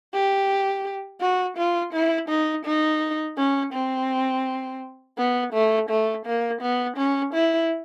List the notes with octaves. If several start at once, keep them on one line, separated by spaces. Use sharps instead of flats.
G4
F#4
F4
E4
D#4
D#4
C#4
C4
B3
A3
A3
A#3
B3
C#4
E4